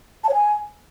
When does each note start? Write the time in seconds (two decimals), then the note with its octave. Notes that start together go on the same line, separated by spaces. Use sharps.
0.24 A5
0.29 C#5
0.34 G#5